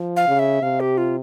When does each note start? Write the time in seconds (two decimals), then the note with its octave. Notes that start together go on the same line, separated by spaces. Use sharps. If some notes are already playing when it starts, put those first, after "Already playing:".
Already playing: F3
0.16 F5
0.28 C#3
0.39 E5
0.62 C3 F5
0.80 G4
0.98 F4